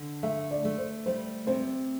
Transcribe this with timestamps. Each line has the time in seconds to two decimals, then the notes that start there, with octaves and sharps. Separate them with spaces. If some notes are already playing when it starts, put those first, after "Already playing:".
Already playing: D3
0.23 A3 E5
0.51 D5
0.65 A3
0.78 C5
1.06 G3 C5
1.47 C3 C5